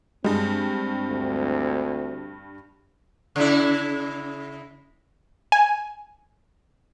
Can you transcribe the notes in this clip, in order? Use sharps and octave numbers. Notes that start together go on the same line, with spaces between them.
G2 G3 G#3 C4
D2
C#3 E4
G#5